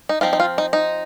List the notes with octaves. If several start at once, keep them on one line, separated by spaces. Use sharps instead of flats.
D#4
F3 C4 D#4 F4
D#4
F4
D#4
D#4